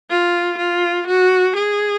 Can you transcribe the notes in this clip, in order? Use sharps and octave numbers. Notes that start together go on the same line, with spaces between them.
F4
F4
F#4
G#4